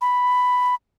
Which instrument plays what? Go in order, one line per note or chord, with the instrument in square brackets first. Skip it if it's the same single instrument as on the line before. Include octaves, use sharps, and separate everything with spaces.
[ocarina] B5